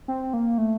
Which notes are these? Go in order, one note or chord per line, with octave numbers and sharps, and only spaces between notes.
C4
A#3
A3